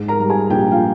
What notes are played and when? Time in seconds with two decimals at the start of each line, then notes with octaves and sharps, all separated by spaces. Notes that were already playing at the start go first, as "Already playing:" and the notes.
Already playing: G#2
0.08 A#4 A#5
0.20 G3
0.29 G#4 G#5
0.50 A#1 G4 G5
0.71 F4 F5